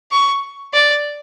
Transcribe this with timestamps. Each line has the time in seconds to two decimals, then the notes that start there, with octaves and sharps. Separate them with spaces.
0.11 C#6
0.73 D5